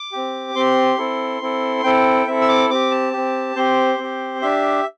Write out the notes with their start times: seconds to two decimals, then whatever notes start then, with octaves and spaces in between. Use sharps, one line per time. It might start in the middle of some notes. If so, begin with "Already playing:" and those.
Already playing: D6
0.12 C4 G4
0.55 C4 G4 C6
0.98 C4 E4 A4
1.41 C4 E4 A4
1.84 C4 E4 A4 G5
2.27 C4 E4 A4 E5
2.41 E6
2.48 D6
2.70 C4 G4 D6
2.91 A5
3.13 C4 G4
3.56 C4 G4 C5
3.98 C4
4.03 G4
4.42 D4 G4 E5